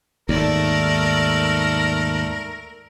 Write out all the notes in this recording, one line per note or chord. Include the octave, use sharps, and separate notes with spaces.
D#2 G#2 A3 A#4 D5